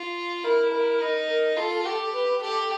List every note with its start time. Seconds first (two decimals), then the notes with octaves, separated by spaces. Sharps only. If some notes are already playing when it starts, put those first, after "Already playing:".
Already playing: F4
0.44 E4 A#4
0.72 A#4
1.00 D#4
1.28 A#4
1.57 F4 A4
1.85 G4 A4
2.13 B4
2.42 G4 A4